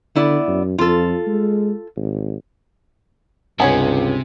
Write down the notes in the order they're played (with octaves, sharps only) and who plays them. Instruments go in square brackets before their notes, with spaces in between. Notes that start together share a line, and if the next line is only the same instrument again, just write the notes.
[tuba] D3 [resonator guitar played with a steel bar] B3 E4 D5
[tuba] F#2
[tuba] F2 [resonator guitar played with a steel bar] F4 A4
[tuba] G#3
G#1
[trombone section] C#2 G2 [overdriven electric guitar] C3 [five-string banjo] B3 C#4 C#5 [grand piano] G#5